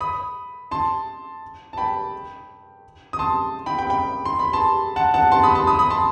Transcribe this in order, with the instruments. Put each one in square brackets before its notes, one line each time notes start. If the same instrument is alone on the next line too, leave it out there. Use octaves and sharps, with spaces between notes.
[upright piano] B5 D#6
A5 C6
A5
G5 B5
D#6
A5 C6
G5 B5
G5 B5
G5 B5
C6
B5
A5 C6
F#5 A5
F#5 A5
A5 C6
B5 D#6
A5 C6
B5 D#6
B5 D#6
A5 C6